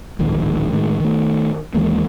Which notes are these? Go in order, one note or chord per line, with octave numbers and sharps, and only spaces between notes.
D1 A#1 G#2 D#3
A2 D#3 G#3
D#3 A3
D#2 E3 G#3 A#3